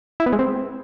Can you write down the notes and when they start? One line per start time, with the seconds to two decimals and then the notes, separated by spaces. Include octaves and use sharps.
0.20 E4
0.26 B3
0.33 G#3
0.39 C4